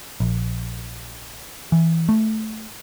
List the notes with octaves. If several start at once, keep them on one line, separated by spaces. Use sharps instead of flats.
A#1
E3
A3